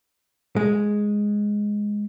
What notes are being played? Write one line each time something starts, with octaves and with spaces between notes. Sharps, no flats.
G#3